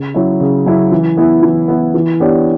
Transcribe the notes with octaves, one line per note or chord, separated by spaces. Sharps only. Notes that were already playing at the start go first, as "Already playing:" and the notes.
Already playing: C#3
F#3 C#4 E4
C#3
F#3 C#4 E4
E3
B3 E4
E3
B3 E4
E3
B3 D4 G4 C#5